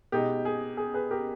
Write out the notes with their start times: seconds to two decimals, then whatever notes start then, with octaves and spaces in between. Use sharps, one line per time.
0.12 B2 G#3 D#4 G4
0.45 G#4
0.77 G#4
0.94 G#4 B4
1.11 G4 A#4